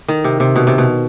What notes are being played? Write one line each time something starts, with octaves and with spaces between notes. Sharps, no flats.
D#3
C3
C3
B2
C3
B2